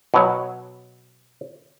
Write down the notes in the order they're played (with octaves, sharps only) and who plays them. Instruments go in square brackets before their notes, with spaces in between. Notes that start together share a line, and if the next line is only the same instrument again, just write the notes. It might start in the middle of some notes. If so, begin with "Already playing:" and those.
[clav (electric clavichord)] B2 F#3